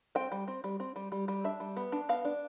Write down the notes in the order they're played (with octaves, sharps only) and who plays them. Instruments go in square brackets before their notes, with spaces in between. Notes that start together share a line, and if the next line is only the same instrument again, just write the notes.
[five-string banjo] C4 G5
G3
C4
G3
C4
G3
G3
G3
D4 E5
G3
B3
D4
B3 F5
D4